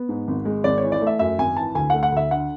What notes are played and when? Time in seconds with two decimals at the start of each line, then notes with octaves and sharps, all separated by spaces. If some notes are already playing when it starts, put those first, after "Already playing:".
Already playing: B3
0.09 G#2
0.28 G#1
0.45 G#3
0.64 G#1 D5
0.78 C#5
0.83 E3
0.92 D5
1.01 A3
1.07 E5
1.19 F#2 E5
1.38 G#1 G#5
1.57 E3 A5
1.75 D2 G#5
1.90 A3 F#5
2.03 F#5
2.12 D2 E5
2.31 D3 F#5